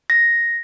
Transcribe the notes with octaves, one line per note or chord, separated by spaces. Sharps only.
A#6